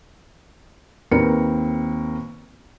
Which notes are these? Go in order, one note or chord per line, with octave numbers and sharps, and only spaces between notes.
D#2 C4 A#4 B4 C#7